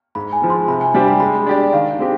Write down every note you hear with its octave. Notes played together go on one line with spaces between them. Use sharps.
G#2 B5
G#5
F3 G#3
C6
C3 B5
G#5
G3 D4 G4 C5 G#5
B5
G#3 B5
D4 G4 D5
D#3 F5
G#3 C4 G4